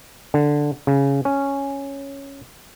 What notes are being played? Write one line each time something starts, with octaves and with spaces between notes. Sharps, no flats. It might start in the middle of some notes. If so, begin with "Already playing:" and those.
D3
C#3
C#4